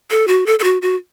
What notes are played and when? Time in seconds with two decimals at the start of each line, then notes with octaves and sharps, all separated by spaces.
0.10 A4
0.28 F#4
0.46 A4
0.59 A4
0.64 F#4
0.82 F#4